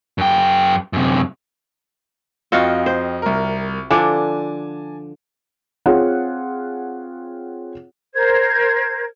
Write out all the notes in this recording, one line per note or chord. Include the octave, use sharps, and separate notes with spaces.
F#2 G5
F#2 C3
F2 C4 F4 F#4 D#5 F5
C5
C2 A#4
D3 F3 D4 G#5 A5 D6
C4 F4 G#4 C#5 F#5
A#4 C5 G#6